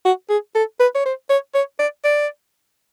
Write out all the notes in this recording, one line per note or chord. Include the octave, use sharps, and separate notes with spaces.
F#4
G#4
A4
B4
C#5
C5
C#5
C#5
D5
D5